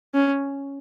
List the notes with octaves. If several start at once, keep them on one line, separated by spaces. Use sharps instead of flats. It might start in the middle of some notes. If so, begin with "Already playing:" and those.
C#4